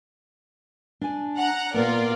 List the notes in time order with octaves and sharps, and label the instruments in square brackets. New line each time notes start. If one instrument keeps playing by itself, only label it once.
[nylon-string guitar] D4 G#5
[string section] F#5 A#5
[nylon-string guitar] A#2 A#3 B3 [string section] F4 A#4 D5